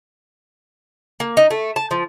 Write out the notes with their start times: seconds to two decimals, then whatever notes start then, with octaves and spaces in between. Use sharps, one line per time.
1.20 A#3
1.37 D#4
1.51 A3
1.76 A5
1.91 F3